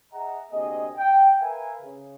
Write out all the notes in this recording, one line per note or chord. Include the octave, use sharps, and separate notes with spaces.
G#4 D#5 E5 F#5 A#5
D2 C3 A#3 G#4 D#5
G5
A#4 B4 E5 F5 G#5
C#3